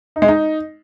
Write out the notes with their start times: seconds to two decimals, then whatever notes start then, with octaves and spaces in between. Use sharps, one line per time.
0.16 D#4
0.22 G#3
0.28 D#4